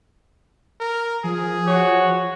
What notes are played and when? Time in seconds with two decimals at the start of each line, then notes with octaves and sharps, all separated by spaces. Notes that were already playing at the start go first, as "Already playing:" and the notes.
0.80 A#4
1.24 F3 G#4
1.68 F#4 C#5